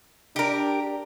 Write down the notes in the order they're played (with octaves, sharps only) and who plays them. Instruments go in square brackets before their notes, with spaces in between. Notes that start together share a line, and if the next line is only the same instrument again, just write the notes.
[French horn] D4 [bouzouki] G4 A#4